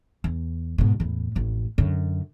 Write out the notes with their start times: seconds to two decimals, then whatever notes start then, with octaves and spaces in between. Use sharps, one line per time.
0.24 E2
0.78 G#2 B2
1.00 E2 A2
1.35 A1 F2
1.78 F#2 D3